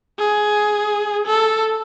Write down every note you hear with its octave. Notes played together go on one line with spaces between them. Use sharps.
G#4
A4